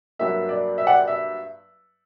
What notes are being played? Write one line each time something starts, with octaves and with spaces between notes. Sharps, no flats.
G2 F#3 A#3 E5
D5
E5
D5 F#5
E5